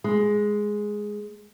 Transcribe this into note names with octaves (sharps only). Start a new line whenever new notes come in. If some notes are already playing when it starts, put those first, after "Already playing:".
G#3